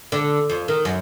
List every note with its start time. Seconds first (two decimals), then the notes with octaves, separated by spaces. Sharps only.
0.12 D3
0.50 F2
0.68 D#3
0.85 F#2